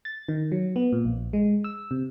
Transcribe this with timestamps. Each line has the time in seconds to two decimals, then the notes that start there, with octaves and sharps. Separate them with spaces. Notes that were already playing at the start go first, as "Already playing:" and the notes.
0.05 A6
0.28 D#3
0.52 F#3
0.76 B3
0.92 A#2
1.05 A#1
1.33 G#3
1.64 E6
1.91 C3